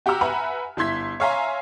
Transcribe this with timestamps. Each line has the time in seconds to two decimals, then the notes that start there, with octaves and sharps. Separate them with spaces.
0.06 F#4 G4 F#5 A#5 E6 F6
0.21 B4 E5 F#5 G#5 A#5 B5
0.77 G1 E4 C6 G#6 B6
1.20 C#5 E5 F5 G#5 A#5 C6